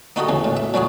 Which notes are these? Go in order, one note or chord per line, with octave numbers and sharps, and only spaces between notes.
A#3 D#4 F#4 G4 A4 D#5
D#2 C#3 E3
A2
E5
A#2 F#3 F#4 G#4